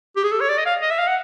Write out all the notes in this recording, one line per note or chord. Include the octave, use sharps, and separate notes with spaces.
G4
G#4
A4
C#5
D5
D#5
F5
D#5
E5
F5
F#5